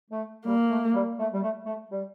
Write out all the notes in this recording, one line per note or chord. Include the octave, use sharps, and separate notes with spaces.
A3
G3 A#3
A3
G3
A3
G3
A3
A3
G3